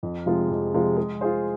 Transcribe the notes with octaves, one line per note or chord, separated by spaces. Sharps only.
F2
C3 F3 G#3 F4
F2
C3 F3 G#3 F4
G#3
F4 G#4 C5